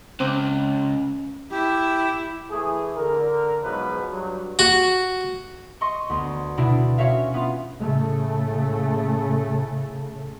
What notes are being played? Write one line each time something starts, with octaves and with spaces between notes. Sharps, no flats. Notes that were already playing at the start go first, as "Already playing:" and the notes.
C#2 C4 C#4 D6
E4 G4
E3 A3 G#4
D3 A#4
G#2 B2 F3 F#3 B4
G2 F#3
F#4
D#5 C6 C#6
D2 B3 C6
B2 D4 E4
C#4 F#4 C#5 E5 F5
B3 F4
A2 C#3 A3